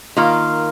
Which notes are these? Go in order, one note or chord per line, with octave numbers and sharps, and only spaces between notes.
D#3 A#3 F4